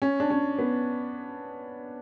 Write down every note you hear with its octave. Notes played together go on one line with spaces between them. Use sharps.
C#4
D4
C#4
B3